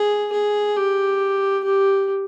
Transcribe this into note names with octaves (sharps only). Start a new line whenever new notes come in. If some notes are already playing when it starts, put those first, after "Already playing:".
Already playing: G#4
G#4
G4
G4